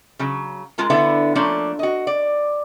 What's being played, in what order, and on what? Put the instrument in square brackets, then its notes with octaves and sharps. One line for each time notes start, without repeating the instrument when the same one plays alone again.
[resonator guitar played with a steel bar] C#3 F#3
G#3 F4 A#4 A5
D3 B3 E4 A4 E5
F3 A3 A#3 C#4 D4
F#4 D#5
D5